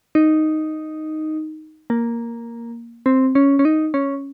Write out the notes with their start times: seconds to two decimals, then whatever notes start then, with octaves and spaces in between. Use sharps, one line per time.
0.15 D#4
1.90 A#3
3.06 C4
3.35 C#4
3.59 C#4
3.65 D#4
3.94 C#4